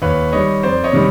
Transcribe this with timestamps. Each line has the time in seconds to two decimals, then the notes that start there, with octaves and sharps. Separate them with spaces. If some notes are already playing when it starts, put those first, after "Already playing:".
0.02 D#2 B4 C#5
0.32 D#3 G3 C#5 D#5
0.63 F2 C5 D5
0.84 C#5 D#5
0.93 C3 D#3 G3